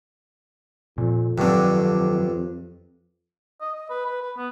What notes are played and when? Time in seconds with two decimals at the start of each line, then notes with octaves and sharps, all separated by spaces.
0.98 F2 A#2
1.38 G2 D3 D#3 F#3 C4
3.61 D#5
3.75 D#5
3.90 B4
4.06 B4
4.22 B4
4.37 B3